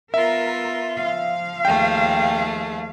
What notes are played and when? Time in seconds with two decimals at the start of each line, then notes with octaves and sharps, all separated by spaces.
0.14 B3 F4 A#4 E5
0.96 F3 F5
1.65 D#2 A3 G#4 G5